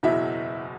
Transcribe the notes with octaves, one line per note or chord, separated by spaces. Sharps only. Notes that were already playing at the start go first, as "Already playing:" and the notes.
F#1 E2 B2 F#3 E4 E5